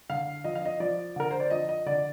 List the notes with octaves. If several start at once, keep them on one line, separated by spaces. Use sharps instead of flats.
D3 F5
F3 D#5
F5
D#5
F3 D5
D3 A#4
C5
D5
F3 D#5
D#5
D3 D5